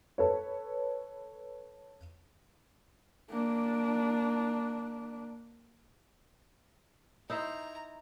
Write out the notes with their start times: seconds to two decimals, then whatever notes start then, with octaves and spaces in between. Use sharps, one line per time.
0.18 A4 B4 C#5
3.30 A#3 D4
7.30 D#4 E4 C5 A#5